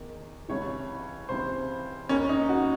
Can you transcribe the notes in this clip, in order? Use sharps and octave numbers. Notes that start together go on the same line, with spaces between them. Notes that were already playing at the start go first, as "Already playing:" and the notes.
Already playing: E2 D#3
C#2 C3 E3 C#5
C#2 C3 E3 C5
D#2 D#3 C#4
D#4
F#4